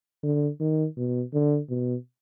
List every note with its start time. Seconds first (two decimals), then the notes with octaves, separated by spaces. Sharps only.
0.24 D3
0.61 D#3
0.97 B2
1.34 D3
1.70 B2